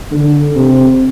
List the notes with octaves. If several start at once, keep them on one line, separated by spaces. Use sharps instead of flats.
D3
C3